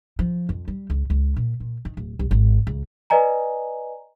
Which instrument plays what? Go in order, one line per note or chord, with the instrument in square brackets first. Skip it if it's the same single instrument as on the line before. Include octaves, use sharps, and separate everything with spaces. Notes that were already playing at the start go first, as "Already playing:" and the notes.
[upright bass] F3
F2
G3
C#2
C#2
A#2
A#2
D#3
D1
C2
G#1
C#2
[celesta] B4 D5 D#5 G#5 A#5